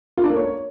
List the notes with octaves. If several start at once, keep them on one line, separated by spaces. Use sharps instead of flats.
F4
D4
A#3
C#5